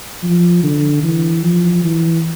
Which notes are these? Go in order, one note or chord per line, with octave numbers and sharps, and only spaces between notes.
F3
D3
E3
F3
E3